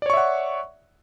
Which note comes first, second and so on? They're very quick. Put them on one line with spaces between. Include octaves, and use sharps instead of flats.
D5 C#5 C#6 E5 F#5